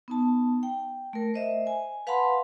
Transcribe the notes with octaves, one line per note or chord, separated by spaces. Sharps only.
B3 D#4 A5
G5
A3 A#4
C5 D#5 E5
G#5
B4 F5 F#5 A5 B5 C6